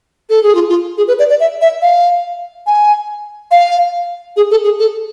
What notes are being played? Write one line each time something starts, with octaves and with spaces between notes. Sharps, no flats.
A4
G#4
F4
F4
G#4
B4
D5
D5
E5
E5
F5
G#5
F5
G#4
A4
G#4
A4